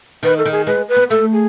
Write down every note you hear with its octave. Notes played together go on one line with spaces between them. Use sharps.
D#3 B4
A4
D#3
G#4
G#3 B4
B4
B3
A3 A4
G#4